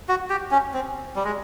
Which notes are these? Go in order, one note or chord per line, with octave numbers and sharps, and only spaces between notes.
F#4
G4
C#4
C4
G3
G#3